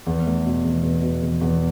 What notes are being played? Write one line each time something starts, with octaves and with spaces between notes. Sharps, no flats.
E2
A3
B2
E2
E2
B2
E2
E2